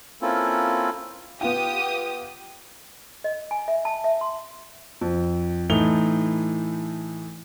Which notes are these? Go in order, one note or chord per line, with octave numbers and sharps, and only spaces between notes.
A#3 C4 C#4 E4 F4 A4
B3 F4 G4 G5 D#6
D#5
G#5
E5
A5
E5
C6
F2
A2 E3 A3 D#4 F7 G7